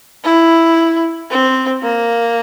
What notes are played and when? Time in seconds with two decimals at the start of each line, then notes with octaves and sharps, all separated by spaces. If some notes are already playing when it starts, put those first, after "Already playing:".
0.24 E4
1.30 C4
1.83 A#3